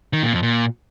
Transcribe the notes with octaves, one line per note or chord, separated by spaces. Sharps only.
D#3
A#2
F2
A#2